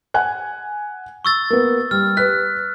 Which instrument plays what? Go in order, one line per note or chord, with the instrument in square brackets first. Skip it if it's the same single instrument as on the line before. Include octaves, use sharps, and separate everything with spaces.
[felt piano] F#5 G#5 F#6
[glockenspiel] C#6 E6 A6
[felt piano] A#3 B3
[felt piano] G3 [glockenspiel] F6
[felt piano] B4 B6 [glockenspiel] F#6